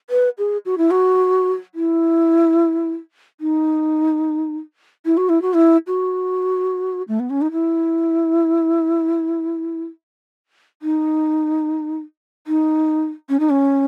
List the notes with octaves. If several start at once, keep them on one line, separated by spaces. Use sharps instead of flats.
B4
G#4
F#4
E4
F#4
E4
D#4
E4
F#4
E4
F#4
E4
F#4
A3
B3
C#4
D#4
E4
D#4
D#4
C#4
D#4
C#4